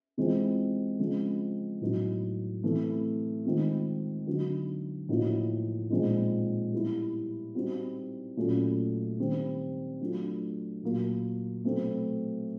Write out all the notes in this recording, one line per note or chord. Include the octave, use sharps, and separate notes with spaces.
C3 E3 G#3 C4 F4
C#3 F3 G#3 C4
A2 F#3 B3 D#4
C3 E3 A3
D#3 G#3 C4 F4
D3 F#3 B3 D#4 F#4
A2 F3 A#3 D#4 F#4
A#2 F3 G#3 C4 D#4
G3 B3 E4
G3 C4 D#4 F#4
A#2 F#3 A3 C#4
C3 D#3 G3 C4
F#3 A3 D4 F4
A#2 F#3 A#3
B2 F#3 A3 C4